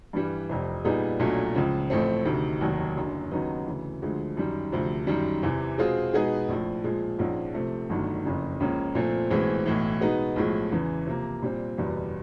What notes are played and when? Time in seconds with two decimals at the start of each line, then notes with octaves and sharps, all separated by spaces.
0.13 G2 E3 G3
0.50 F1 F2 C3
0.85 A#2 G3 B3 D#4 G#4
1.19 B1 A#2 F#3 A3 D4
1.55 C#2 C#3 F3
1.90 A1 A2 F3 A3 C4
2.25 D2 C3 D#3
2.61 F1 D#2 D#3 F#3
2.96 F#1 F#2 D3
3.31 D#2 C#3 F#3 B3 D#4
3.67 D2 C#3 E3
4.02 D2 D3 F3 G#3
4.37 F#2 D#3 G3
4.72 D2 C3 F3
5.07 F#2 D#3 G3
5.43 E2 C3 E3
5.78 B2 G#3 C4 F4 G#4
6.13 B2 G#3 B3 D#4 G#4
6.49 A#1 A2 F3
6.84 A#2 F3 G#3
7.19 A#1 G#2 F3 G#3 C#4
7.54 C3 F3 A3 C4
7.89 G1 G2 D#3 F#3 A3
8.25 F#1 F2 C#3
8.60 C#2 C#3 F3 A#3 C#4
8.95 A#2 F3 A3 C4
9.30 B1 A2 E3 G#3 C4
9.66 B1 A2 E3
10.01 B2 G#3 B3 D#4
10.36 B1 A2 F3 G#3
10.72 E2 C#3 E3
11.06 C3 F3 A#3
11.42 A#2 G3 C4
11.78 F#1 E2 B2 G3 B3